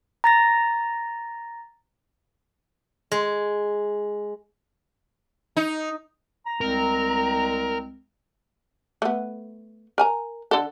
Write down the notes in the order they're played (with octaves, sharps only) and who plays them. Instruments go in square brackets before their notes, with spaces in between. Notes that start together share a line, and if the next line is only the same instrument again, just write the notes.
[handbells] A#5 A6 A#6
[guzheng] G#3
[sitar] D#4
[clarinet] A#5
[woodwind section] C2 G#3 C4 [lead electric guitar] A#4
[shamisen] A3 B3
A#4 G#5 A#5
D3 A4